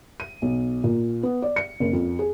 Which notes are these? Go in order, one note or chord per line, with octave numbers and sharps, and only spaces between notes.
D#7
B1
A#2
B3
D5
C#7
F#1
F2
G#4